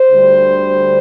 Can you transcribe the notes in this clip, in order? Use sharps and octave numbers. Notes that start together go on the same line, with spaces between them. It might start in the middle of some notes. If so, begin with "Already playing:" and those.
Already playing: C5
D2 D3 G3